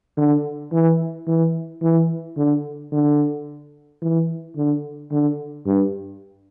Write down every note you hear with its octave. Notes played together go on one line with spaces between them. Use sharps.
D3
E3
E3
E3
D3
D3
E3
D3
D3
G2